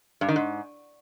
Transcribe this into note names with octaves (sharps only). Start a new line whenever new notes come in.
G2
D#3
G#2